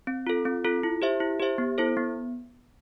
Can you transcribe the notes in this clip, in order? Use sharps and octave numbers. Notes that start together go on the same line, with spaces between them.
C4
F4 A4
C4
F4 A4
E4
G4 C5 E5
E4
G4 C5 E5
B3
E4 A4 C5
B3